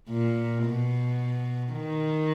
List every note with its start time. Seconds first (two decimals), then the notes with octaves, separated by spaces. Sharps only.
0.10 A#2
0.65 B2
1.73 D#3